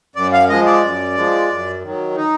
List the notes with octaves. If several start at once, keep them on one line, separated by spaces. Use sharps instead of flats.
F#2 D5
F5
F3 G#3 D#5
D5
F#2
F3 G#3
F#2
D#3 F#3
D#4